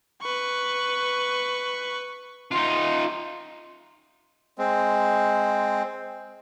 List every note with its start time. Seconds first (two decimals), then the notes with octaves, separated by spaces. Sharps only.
0.22 B4 C#6
2.51 D#4 F4
4.58 G#3 C4